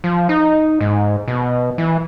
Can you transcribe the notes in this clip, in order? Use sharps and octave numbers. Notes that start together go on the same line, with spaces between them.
F3
D#4
G#2
B2
E3